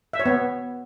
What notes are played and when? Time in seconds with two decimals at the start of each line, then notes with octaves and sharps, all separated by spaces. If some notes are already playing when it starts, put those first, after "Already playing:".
0.13 E5
0.20 C#5
0.26 B3